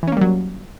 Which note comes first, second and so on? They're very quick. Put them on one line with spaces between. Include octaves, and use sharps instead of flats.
E3 C#4 A#3 G3 F#3